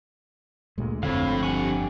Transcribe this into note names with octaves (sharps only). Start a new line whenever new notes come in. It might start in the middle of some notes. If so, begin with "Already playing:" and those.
D2 A#2 G#3
G1 F2 A2 D3 E4 C#5 F5
G2 G4 F#5 G#5 C#6